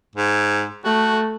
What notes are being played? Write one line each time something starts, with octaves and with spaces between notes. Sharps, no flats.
G#2
A3 F#4